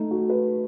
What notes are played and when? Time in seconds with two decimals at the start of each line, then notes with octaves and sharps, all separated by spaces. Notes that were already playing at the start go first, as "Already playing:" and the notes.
Already playing: A3 D#4
0.11 F#4
0.30 B4